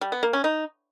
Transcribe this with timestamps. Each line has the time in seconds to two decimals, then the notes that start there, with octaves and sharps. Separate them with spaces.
0.01 G3
0.12 B3
0.23 A#3
0.33 C#4
0.44 D#4